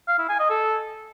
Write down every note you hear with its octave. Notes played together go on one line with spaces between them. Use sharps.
F5
E4
G#5
D#5
A4